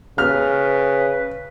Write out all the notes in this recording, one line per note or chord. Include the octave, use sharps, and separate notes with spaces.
C#3 B4 F6